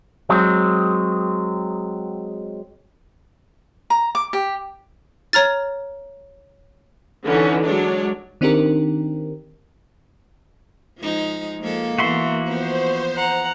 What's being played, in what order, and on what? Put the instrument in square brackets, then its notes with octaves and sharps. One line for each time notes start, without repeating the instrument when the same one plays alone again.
[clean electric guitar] F#3 G#3 C4
[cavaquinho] A#5
D6
G4
[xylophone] C#5 A#5 F6 A6
[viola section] D3 E3 C#4 D#4
F#3 G#3 D4 C#5
[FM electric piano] D#3 C4 D4 D#4 G4 A#4
[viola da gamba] F3 G#3 D#4
[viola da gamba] F3 G#3 A4 [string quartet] A#3
[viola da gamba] E3 B3 [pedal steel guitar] F#4 E5 C6
[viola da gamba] F3 B3 [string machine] C5
[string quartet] F#5 A#5